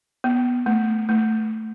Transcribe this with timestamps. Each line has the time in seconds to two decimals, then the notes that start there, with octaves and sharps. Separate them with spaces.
0.24 B3
0.66 A3
1.09 A3